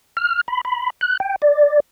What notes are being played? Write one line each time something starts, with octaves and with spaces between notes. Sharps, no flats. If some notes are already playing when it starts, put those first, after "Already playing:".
F6
B5
B5
F#6
G5
D5